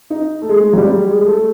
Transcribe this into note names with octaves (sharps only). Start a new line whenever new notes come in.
D#4
A3
G#3
F#3
G3
G#3
G#3
A3